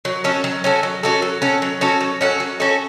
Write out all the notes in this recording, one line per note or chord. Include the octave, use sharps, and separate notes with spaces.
F#3
C#4 F#4 A4
F#3
C#4 F#4 A4
F#3
C#4 F#4 A4
F#3
C#4 F#4 A4
F#3
C#4 F#4 A4
F#3
C#4 F#4 A4
F#3
C#4 F#4 A4